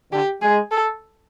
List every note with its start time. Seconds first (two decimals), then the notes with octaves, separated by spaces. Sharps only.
0.12 D3 G4
0.42 G#3 G#4
0.71 A4